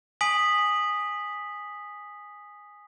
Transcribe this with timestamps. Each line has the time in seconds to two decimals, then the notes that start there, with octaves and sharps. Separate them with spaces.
0.21 G#5 D#6 B6 D7 F#7